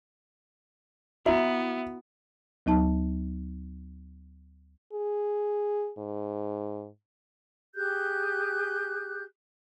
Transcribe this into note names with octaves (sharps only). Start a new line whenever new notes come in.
B3 E4 F#4 E5
D2 F#3 D#4 A5
G#4
G#2
G4 G#4 F#6 G6